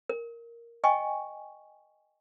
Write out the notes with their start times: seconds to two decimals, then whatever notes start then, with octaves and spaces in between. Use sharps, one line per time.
0.09 A#4
0.84 D#5 G5 G#5 C#6